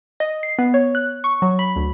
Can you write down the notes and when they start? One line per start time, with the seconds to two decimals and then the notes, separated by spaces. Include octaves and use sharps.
0.20 D#5
0.43 C7
0.59 B3
0.74 C#5
0.95 F#6
1.24 C#6
1.42 F#3
1.59 B5
1.76 D2